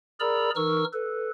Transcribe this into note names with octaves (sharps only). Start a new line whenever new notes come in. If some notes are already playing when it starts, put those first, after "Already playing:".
G#4 A#4 D5 A#5 B5 E6
E3 D#4 A#4 C#6 E6 F6
A4 B4